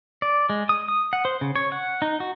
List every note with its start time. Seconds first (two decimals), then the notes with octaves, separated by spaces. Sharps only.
0.22 D5
0.50 G#3
0.69 D#6
0.88 D#6
1.13 F#5
1.25 C5
1.41 C#3
1.56 C#5
1.72 F#5
2.02 D#4
2.20 F#4